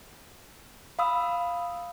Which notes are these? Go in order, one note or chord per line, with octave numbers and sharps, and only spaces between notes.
F5 B5 D#6 E6